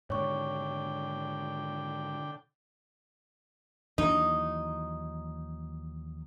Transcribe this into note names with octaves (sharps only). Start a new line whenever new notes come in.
G#2 B2 D3 D#3 C#5 G5 C#6
D#2 E3 F#3 D#4